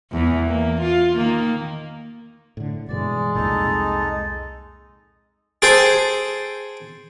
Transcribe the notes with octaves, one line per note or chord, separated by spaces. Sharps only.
E2 E3
A#3
F4
D#3 A#3
A2 D3
G2 B2 E3 G#3 D5
C2 F2 A#2 D#4 A4
G#4 A4 C5 G5